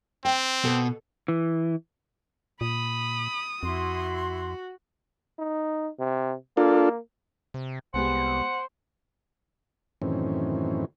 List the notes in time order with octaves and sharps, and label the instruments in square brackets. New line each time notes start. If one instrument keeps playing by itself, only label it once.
[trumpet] C4 [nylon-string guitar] G5
[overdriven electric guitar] B2 [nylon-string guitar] A4
[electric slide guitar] E3
[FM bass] A#2 [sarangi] B5 [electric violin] D#6
[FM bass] F2 [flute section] E4 C6 [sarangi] F#4
[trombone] D#4
C3
[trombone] A#3 [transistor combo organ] D4 F4 A4
[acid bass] C3
[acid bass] C2 [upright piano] G#3 B3 G4 [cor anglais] C5 [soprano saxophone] F#5
[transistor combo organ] F#2 A2 D#3 E3 C4 C#4